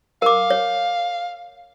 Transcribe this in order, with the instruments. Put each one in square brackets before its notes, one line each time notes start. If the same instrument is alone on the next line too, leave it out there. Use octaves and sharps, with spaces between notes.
[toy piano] A#4 D6 [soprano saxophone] F5
[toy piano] C#5